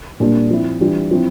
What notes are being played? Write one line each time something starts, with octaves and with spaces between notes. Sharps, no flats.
A#2 G3 D4
F3 C4 E4
E3 G3 D4 F4
F3 C4 E4